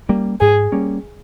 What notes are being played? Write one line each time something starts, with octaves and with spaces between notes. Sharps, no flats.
G3 A#3 C#4
G#2 G#4
G3 A#3 C#4